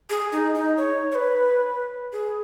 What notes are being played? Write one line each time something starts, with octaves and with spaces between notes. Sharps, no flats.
G#4
D#4
D#4
C#5
C#5
B4
G#4